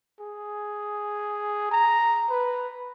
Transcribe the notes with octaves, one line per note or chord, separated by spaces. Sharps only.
G#4
A#5
B4